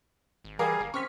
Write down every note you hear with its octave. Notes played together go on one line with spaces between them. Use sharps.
G#1
E3 G3 G#4 A#4 F5 D6
G1
C4 C#4 C#6 F6 B6